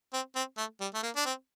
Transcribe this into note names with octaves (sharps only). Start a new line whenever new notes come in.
C4
C4
A3
G3
A3
A#3
D4
C4